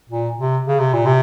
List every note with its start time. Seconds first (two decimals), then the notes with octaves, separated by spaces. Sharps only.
0.10 A#2
0.39 C3
0.67 C#3
0.79 C3
0.93 A#2
1.06 C3